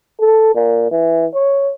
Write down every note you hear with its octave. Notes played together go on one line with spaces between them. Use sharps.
A4
A#2
E3
C#5